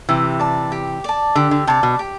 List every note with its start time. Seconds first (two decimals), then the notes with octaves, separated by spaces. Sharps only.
0.09 C3 E3 G4
0.40 D5 A5
0.72 G4
1.04 D5 A5
1.35 D3 G4
1.51 D3
1.67 C3 D5 A5
1.83 B2
1.99 G4